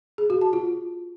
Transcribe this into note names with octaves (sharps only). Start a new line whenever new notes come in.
G#4
F#4
A5
F4